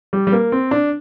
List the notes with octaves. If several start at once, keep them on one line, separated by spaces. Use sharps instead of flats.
G3
G3
A#3
C4
D4